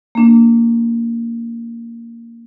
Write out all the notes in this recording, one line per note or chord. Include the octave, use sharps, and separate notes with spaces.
A#3 D4